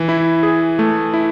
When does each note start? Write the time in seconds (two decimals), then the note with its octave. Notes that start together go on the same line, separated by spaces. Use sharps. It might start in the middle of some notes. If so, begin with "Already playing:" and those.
Already playing: E3
0.09 E4
0.43 G#4
0.79 A3
1.14 E4